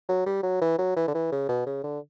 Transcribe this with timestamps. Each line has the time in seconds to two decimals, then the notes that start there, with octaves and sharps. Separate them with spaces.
0.09 F#3
0.26 G3
0.43 F#3
0.61 E3
0.78 F#3
0.96 E3
1.08 D3
1.14 E3
1.32 C#3
1.49 B2
1.66 C#3
1.83 D3